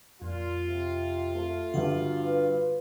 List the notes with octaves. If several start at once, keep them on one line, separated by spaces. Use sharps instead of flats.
F2 A#2 F4
C3
A3 A4
G2 D3 F#4
B4